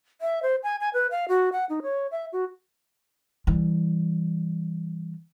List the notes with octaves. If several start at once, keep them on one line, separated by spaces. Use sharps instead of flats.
E5
C5
G#5
G#5
B4
F5
F#4
F#5
D#4
C#5
E5
F#4
E3 G3